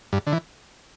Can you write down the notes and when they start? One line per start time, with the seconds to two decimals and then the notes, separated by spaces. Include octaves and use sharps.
0.13 G2
0.27 D3
0.32 E3